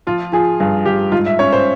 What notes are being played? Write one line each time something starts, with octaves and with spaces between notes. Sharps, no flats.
F3 F4
F3 G#4
G2 G#4
G2 G4
G#2 F4
E5
C#4 C#5
C5